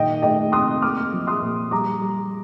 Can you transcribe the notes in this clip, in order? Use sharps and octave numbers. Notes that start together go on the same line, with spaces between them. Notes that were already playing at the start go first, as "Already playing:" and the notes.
Already playing: A#2 D#3 D#5 G5
A3 D#5 G5
C3 C6 D#6
A#3 D6 F6
F3
C6 D#6
A#2
G3 A#5 D6
G3